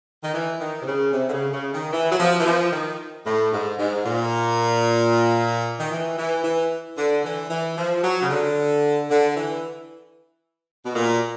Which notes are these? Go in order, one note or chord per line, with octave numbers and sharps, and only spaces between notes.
D#3
E3
D#3
C3
C#3
C3
D3
C#3
C#3
D#3
E3
F#3
F3
E3
F3
D#3
A2
G#2
G#2
A#2
D#3
E3
E3
E3
D3
E3
E3
F3
F#3
C#3
D3
D3
E3
B2
A#2